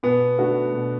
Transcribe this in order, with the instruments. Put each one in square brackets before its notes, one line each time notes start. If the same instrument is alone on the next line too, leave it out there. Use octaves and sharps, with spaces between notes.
[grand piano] B2 [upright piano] B3
[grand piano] A3 D4 F#4
B2